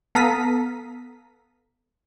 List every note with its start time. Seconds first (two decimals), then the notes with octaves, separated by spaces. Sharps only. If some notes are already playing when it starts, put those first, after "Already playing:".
0.15 B3 A4 F5 A#5 D#6 B6